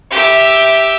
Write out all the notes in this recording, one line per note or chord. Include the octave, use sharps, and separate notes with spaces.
G4 E5